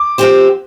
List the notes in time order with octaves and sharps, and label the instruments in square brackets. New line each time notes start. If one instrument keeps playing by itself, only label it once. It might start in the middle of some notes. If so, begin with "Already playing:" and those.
Already playing: [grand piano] D6
[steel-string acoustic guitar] F3 C4 G4 C5